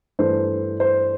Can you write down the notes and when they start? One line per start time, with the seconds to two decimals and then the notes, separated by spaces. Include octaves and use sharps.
0.19 G2 E3 A3 C5
0.80 C5